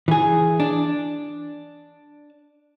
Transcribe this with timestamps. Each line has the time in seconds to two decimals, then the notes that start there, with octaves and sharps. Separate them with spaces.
0.08 E3 G#4
0.60 D4